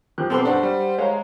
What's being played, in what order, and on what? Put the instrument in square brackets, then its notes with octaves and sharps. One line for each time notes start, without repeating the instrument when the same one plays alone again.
[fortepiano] F3 G4 F#6
[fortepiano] B1 B3 D6 [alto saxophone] C4 [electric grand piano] A4 A5 C6
[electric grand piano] G2 D4 [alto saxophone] C5 [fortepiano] F#5
[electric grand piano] G3
[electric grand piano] G#3 [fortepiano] C#5 F5 A#5